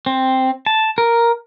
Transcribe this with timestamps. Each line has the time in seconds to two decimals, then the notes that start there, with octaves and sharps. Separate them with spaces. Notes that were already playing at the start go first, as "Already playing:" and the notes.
0.06 C4
0.66 A5
0.98 A#4